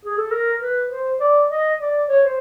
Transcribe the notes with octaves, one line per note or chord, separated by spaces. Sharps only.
G#4
A4
A#4
B4
C5
D5
D#5
D5
C#5
C5